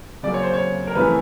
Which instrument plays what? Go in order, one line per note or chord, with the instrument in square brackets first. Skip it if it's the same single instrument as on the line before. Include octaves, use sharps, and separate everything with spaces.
[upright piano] C#3 F#3 A#3 [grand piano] D5
[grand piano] C#5
C5
C#5
A#4
[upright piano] F2 C#3 E3 A3 C#4 [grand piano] B4